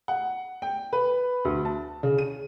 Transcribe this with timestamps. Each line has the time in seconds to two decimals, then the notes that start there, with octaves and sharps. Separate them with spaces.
0.08 F#5
0.62 G5
0.93 B4
1.45 D2
1.65 A5
2.03 C#3
2.18 D#7